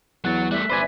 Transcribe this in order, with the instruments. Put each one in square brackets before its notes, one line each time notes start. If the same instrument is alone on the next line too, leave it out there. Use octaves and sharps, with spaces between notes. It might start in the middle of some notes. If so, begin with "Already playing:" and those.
[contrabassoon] E2 [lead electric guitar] F#3 [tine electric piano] F#5 A6
[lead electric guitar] G3 A3 [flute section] E5 [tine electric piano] F#6
[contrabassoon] G1 [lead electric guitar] D4 C5 [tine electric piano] B4 D5 G#5